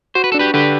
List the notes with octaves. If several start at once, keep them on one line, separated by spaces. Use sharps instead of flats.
F#4 C5
B4
D4 A4
G4 B4
D3 G4 B4